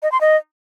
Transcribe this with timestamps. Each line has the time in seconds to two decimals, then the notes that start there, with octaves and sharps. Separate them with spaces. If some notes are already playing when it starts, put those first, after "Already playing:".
0.03 D#5
0.12 C6
0.21 D#5